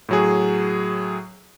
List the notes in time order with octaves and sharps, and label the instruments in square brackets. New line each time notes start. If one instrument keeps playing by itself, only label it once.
[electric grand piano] A2 F#3 G#4